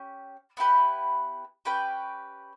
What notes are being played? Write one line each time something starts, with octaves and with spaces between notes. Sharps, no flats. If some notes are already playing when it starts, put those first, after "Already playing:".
Already playing: C#4 G4
B3 E4 G4 B4
C#4 G4 B4 G5